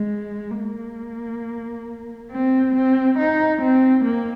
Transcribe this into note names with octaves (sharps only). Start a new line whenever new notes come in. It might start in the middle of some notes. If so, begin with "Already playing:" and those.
Already playing: G#3
A#3
C4
C4
D#4
C4
A#3